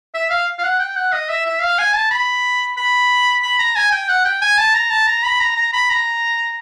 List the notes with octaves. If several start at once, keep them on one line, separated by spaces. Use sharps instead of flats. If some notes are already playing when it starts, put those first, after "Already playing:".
E5
F5
F5
F#5
G5
F#5
D#5
E5
E5
F5
G#5
A5
B5
B5
B5
A#5
G#5
G5
F#5
G5
G#5
A5
A#5
A5
A#5
B5
A#5
A#5
B5
A#5